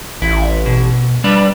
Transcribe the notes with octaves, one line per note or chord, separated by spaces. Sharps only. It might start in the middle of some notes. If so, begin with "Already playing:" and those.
A1 E4
B2
G3 D4 B4